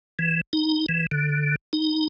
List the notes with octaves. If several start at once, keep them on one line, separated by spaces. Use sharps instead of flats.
E3
D#4
E3
D3
D#4